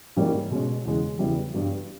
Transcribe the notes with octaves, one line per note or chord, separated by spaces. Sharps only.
G#2 E3 G3 A#3 C#4
B2 G#3 C#4
E2 C#3 G#3
E2 C#3 G3 B3 E4
G2 G3 B3 G4